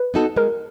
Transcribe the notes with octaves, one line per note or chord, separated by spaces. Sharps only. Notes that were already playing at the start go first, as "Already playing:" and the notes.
Already playing: B4
B3 D#4 F#4 A4
G#3 A#4